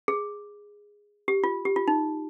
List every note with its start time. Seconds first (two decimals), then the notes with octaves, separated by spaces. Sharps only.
0.08 G#4
1.28 G4
1.44 F4
1.65 G4
1.76 F4
1.88 D#4